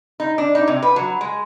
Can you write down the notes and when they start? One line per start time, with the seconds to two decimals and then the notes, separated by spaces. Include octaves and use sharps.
0.20 D#4
0.38 D4
0.55 D#4
0.67 C3
0.82 B4
0.96 F#3
1.21 G#3